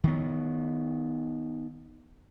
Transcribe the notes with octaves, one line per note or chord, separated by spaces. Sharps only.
D#3 B3